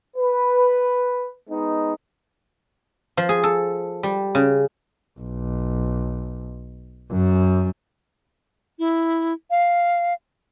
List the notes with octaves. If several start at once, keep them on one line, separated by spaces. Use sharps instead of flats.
B4
G#3 B3 D#4
F3
G#4
A4
G3
C#3
B1
F#2
E4
F5